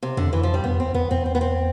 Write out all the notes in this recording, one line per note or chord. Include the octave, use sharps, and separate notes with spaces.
C3
F2 D3
E2
F2 E3
F3
G3
F2 B3
E2 C4
E2 B3
E2 C4
C4
B3
C4